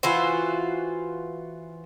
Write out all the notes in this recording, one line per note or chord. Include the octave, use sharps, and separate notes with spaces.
E3 F4 F#4 C5